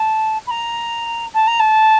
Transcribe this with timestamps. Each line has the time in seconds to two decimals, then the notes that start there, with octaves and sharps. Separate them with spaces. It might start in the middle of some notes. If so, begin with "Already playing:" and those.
Already playing: A5
0.47 B5
0.51 A#5
1.34 A5
1.47 A#5
1.60 A5